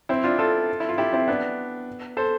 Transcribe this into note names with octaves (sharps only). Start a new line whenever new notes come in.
C4 E4
D4 F4
F4 A4
E4
F4
E4 G4
C4 E4
B3 D4
A4 C5